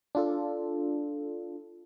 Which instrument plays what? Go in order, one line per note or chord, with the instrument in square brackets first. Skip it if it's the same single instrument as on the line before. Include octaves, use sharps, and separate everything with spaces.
[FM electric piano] D4 F4 A4